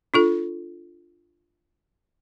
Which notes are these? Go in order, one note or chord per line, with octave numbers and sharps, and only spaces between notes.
D4 F4 A4